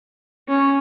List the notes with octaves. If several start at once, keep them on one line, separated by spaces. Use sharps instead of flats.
C#4